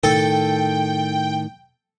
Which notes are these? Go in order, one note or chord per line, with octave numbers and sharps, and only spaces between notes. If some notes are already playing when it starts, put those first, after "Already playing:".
A2 D#3 A4 G5